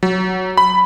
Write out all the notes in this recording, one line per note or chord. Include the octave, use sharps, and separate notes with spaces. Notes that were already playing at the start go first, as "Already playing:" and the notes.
F#3
B5